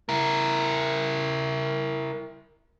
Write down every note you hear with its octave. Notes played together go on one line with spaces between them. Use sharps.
E4 A#4